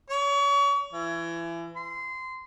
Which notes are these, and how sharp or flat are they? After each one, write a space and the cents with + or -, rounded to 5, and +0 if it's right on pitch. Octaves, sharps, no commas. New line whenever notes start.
C#5 +35
E3 +30
C6 -20